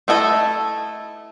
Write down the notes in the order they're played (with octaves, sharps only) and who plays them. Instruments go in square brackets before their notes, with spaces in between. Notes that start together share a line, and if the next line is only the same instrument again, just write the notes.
[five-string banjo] A3 E4 A4 D#5